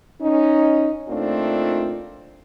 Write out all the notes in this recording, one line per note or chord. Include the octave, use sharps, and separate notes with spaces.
C#4 D#4
A#2 A3 C4 D4 D#4 F4